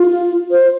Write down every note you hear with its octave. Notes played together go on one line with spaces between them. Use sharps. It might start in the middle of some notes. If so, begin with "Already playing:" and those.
Already playing: F4
C5